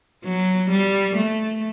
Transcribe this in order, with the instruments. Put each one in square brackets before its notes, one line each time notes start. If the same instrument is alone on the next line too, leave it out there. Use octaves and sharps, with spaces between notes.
[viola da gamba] F#3
G3
A3